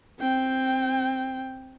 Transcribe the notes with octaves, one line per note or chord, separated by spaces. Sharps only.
C4 G5